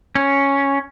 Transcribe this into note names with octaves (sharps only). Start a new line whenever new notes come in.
C#4